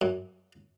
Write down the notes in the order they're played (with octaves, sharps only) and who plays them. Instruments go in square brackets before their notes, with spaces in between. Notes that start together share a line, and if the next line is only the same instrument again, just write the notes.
[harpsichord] F#2